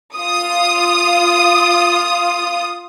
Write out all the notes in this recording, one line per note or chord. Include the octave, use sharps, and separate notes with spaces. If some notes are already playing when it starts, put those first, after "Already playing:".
F4 D#6